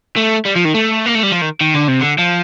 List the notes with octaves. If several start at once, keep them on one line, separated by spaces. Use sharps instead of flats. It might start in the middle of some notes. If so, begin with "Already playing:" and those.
A3
G3
F3
D#3
A3
A#3
A3
G3
F3
D#3
D#3
D3
C3
D3
F3